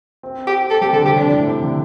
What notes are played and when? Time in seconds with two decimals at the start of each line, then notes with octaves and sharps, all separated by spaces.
0.23 C4
0.47 G4
0.70 C4 A4
0.81 G3 G4
0.93 D3 A4
1.05 C3 G4
1.16 D3 D4
1.32 A2
1.47 C3
1.64 D3